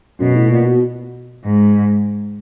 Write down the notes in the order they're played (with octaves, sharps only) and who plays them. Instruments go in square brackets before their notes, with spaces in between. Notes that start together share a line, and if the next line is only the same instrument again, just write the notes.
[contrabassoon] F#2 [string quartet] B2
[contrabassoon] A2
A#2
B2
[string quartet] G#2